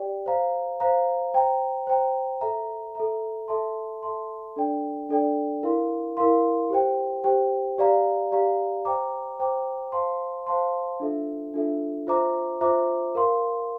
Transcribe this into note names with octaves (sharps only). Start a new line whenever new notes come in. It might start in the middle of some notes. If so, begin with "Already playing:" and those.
Already playing: G4 D5 G5
C5 F5 A#5
C5 F5 A#5
C5 G5 A#5
C5 G5 A#5
A4 E5 A#5
A4 E5 A#5
A4 E5 A5 C6
A4 E5 A5 C6
D4 A4 D5 G5
D4 A4 D5 G5
E4 A#4 F5 C6
E4 A#4 F5 C6
G4 C5 G5
G4 C5 G5
G4 D5 F5 A#5
G4 D5 F5 A#5
C5 G5 A#5 D6
C5 G5 A#5 D6
C5 F5 A5 C6
C5 F5 A5 C6
D4 F4 A4 E5
D4 F4 A4 E5
F4 C5 E5 A#5 D6
F4 C5 E5 A#5 D6
A#4 F5 C6